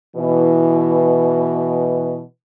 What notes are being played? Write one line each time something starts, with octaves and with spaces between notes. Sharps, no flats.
B2 E3